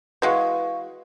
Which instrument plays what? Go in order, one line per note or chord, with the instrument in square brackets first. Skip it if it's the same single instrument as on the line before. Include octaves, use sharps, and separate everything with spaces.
[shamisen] E3 G#3 [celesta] F#4 F5 C#6 [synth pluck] B4 F#5